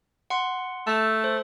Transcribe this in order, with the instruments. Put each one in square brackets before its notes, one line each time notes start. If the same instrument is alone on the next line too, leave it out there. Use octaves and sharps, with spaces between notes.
[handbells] F#5 C6
[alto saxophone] A3 [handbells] A5 E6
[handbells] C5